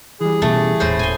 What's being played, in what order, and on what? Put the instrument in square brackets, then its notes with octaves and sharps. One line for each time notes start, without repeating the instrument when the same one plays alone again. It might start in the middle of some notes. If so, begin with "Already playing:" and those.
[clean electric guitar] E3 G3 [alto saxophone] G#4
[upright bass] B2 C#4 [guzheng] A3
[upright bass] D#1 D#2 [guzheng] A2 C5
[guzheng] G#5 C6